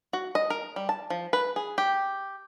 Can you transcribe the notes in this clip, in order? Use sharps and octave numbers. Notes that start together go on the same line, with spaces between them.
F#4
D#5
A#4
G3
A5
F3
B4
G#4
G4